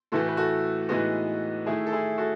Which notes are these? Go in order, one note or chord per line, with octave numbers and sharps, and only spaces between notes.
A2 E3 A3 F#4 A4
B4
F#4 A4
A2 E3 G#3 B3 D#4 F#4
D#3 A3 E4 G#4
A4
E4 G#4
F#4 A4